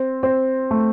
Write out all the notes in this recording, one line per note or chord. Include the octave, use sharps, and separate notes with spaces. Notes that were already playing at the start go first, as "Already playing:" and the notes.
Already playing: C4
C4
A3